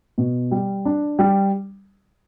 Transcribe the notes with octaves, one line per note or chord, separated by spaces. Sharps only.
B2
G3
D4
G3